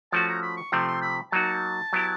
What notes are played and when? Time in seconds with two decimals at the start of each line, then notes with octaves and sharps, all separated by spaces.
0.12 F3 A3 C#4 F#4 A5
0.28 A#5
0.42 B5
0.57 C#6
0.72 C3 F3 A3 C4 C6
0.88 C6
1.02 B5
1.32 F#3 A#3 D#4 F#4 A5
1.93 F#3 B3 E4 G4